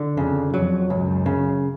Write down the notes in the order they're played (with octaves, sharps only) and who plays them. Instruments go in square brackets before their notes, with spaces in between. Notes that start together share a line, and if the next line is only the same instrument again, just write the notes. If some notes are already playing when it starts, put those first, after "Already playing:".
Already playing: [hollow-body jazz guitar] D3
[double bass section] F2 [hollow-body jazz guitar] C#3
[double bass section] F2 [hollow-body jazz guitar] F#3
[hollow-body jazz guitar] C#2 [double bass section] F#2
[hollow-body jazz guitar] C#3